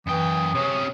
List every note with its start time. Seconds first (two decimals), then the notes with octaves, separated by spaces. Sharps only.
0.07 F#2 E3 G5 D#6
0.55 C3 C#4 C#5